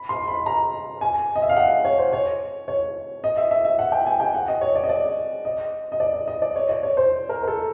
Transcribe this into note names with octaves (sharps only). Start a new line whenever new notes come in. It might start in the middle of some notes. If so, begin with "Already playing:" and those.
Already playing: B5
C6
B5
A#5
G#5
D#5
E5
F5
F#5
C#5
C5
C#5
C#5
D#5
E5
E5
E5
F#5
G5
G#5
G5
F#5
D#5
C#5
D5
D#5
D5
D#5
D#5
D5
D#5
D#5
D5
C#5
D5
C#5
C5
A#4
A#4
A4